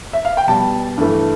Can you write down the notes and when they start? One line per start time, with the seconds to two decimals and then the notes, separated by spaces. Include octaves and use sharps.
0.13 E5
0.25 F5
0.37 G5
0.48 B2 G3 A5
0.98 G2 E3 A3